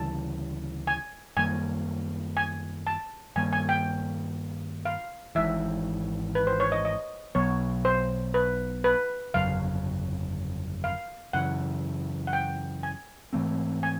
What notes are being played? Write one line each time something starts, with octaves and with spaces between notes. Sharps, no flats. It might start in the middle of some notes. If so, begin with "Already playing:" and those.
Already playing: D2 C#3 E3 G3 A5
G#5
F#2 D#3 G3 A#3 G#5
G#5
A5
G2 D#3 G3 A#3 G#5
G#5
G5
F5
G#1 G#2 E3 E5
B4
C5
C#5
D#5
D#5
B1 B2 F#3 B3 C#5
C5
B4
B4
G1 F2 C#3 F#3 F5
F5
F#2 C#3 E3 F#5
F#5
G5
G#5
G#2 E3 A3 C4
G#5